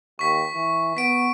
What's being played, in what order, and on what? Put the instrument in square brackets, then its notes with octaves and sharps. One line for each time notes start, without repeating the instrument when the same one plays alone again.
[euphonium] D#2 [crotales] C#6 B6
[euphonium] E3
[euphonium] B3 [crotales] B6 D7